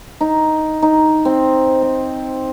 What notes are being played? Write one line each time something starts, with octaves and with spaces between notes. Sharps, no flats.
D#4
D#4
C4
C4